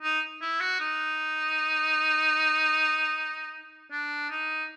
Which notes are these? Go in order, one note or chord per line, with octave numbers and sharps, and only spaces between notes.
D#4
E4
F#4
D#4
D4
D#4